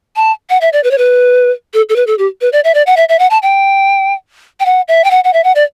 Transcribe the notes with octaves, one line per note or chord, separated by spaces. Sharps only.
A5
F#5
E5
D5
B4
C#5
B4
A4
A4
B4
A4
G4
B4
D5
E5
D5
F#5
E5
E5
F#5
A5
G5
G5
F#5
E5
G5
F#5
F#5
E5
F#5
D5